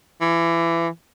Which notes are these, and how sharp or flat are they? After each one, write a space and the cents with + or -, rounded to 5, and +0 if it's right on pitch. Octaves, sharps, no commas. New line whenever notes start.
E3 +25